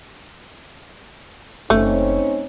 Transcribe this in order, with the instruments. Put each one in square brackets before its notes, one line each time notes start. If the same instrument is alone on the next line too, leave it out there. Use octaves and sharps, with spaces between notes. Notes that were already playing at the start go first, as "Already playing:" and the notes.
[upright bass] F#1 [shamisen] A3 [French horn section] C4 C#4 D#4